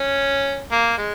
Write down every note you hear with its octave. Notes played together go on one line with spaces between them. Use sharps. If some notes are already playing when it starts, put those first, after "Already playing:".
Already playing: C#4
A#3
G#3